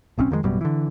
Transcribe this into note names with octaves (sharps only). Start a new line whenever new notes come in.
D1 B1 C4 C#4
F2 D#3 F3 G#3
A1 F#2 B2 G3
D3 E3